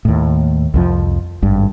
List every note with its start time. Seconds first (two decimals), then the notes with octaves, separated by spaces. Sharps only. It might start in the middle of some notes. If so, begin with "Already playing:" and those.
0.05 D#2 A2
0.74 C2 F2 F3
1.42 G#1 G2